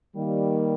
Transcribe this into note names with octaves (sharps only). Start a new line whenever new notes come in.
D#3 G3 A#3